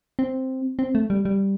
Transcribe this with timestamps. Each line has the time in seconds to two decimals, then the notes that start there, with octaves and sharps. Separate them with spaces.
0.19 C4
0.79 C4
0.95 A3
1.10 G3
1.25 G3